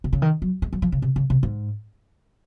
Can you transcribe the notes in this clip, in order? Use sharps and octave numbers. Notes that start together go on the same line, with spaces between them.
C3
C#3
D#3
F#3
G#3
F#3
F3
C#3
C3
C#3
C3
G#2